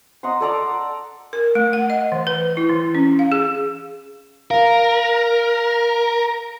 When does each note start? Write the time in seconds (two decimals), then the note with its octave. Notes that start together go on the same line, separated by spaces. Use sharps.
0.23 D#5 F#5 A#5 C6
0.41 A4 D5 A#5 D6
1.33 A#4
1.55 A3
1.73 F#5
1.90 D#5
2.12 E3
2.27 B4
2.57 E4
2.70 E3
2.95 C#4
3.19 F5
3.32 G#4
4.51 A#4 F5